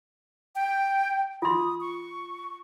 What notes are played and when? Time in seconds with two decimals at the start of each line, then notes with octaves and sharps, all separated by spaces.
0.55 G5
1.42 F4 C6 D#6
1.81 C#6